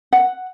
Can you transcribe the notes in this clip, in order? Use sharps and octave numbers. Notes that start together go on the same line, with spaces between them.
F#5